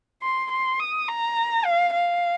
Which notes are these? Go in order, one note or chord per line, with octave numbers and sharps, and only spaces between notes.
C6
C6
D#6
A#5
F5
F5